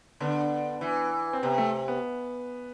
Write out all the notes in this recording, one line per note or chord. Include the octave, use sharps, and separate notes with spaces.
D3 B3 D4
E3
C4
C3 B3
A3
B3